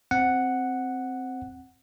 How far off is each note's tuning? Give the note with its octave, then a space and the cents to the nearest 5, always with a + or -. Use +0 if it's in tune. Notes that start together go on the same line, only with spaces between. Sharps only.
C4 +0 F#5 +0